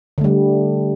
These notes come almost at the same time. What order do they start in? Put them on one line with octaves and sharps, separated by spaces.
D3 A3 G3